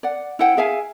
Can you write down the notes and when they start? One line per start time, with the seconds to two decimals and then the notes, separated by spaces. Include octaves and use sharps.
0.03 D5 F#5
0.39 E4 C5 F#5 G5
0.57 G#4 E5 F5 G#5